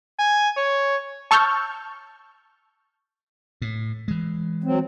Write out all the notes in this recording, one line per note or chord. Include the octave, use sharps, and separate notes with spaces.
G#5
C#5
A5 C#6 E6 F6 G6 A6
A2
E3 G#3
F#3 C4